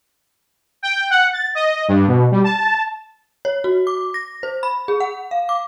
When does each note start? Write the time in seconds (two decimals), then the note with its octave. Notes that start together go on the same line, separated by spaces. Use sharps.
0.83 G5
1.10 F#5
1.33 A6
1.55 D#5
1.88 G2
2.08 B2
2.31 G3
2.44 A5
3.45 C#5
3.64 F#4
3.87 D6
4.14 A#6
4.43 C5
4.63 B5
4.88 G#4
5.00 F#5
5.31 F5
5.49 D6